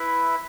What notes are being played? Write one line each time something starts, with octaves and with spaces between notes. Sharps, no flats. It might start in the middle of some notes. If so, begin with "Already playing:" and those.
Already playing: E4 B4 E5